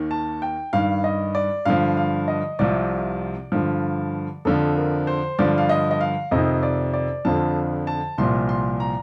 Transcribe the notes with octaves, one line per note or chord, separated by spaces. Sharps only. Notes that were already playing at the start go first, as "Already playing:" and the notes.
Already playing: D#2 D#3
A5
G5
G2 D#3 F5
D#5
D5
G2 D3 F3 F5
F5
D#5
C2 C3 F3 D5
G2 D3 F3
F2 D3 F3 A4
A#4
C5
G2 D3 F3 D5
F5
D#5
D#5
F5
F2 C3 D#3 D#5
D5
D5
F2 D3 F3 A5
A5
C2 A#2 F3 C6
C6
A#5